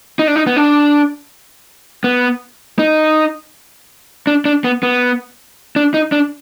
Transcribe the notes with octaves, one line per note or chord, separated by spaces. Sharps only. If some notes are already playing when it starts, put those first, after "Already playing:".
D#4
D4
D#4
B3
D4
B3
D#4
D4
D4
B3
B3
D4
D#4
D4